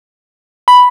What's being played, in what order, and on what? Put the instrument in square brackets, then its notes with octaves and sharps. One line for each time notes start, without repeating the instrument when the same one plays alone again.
[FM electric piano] B5